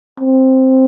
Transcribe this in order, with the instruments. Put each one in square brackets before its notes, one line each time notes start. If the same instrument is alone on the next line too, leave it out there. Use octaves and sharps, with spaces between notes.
[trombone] C4